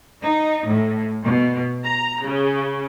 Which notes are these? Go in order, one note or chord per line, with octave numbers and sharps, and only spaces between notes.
D#4
A2
B2
A#5
C#3